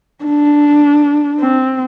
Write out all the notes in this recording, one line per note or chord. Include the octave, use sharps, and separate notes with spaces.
D4
C4